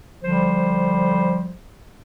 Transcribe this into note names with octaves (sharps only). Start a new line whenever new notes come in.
D3 F3 G3 C5